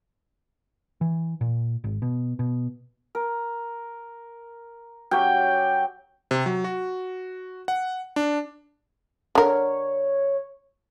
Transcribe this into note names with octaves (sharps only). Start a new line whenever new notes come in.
E3
A#2
G#1
B2
B2
A#4
F#3 C#4 G4 G5
C3
F#3
F#4
F#5
D4
D3 A#4 C#5